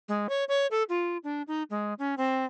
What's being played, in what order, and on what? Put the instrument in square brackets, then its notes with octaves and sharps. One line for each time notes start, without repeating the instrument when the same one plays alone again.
[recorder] G#3
C#5
C#5
A4
F4
D4
D#4
G#3
C#4
C4